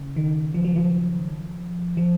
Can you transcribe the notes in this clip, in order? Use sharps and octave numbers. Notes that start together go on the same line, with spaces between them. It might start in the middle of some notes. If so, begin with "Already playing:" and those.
Already playing: C#3
D#3
F3
F#3
F3
F3